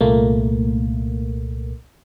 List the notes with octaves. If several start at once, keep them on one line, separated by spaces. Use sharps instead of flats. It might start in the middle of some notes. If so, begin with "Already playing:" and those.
C2 A#2 A3 A#3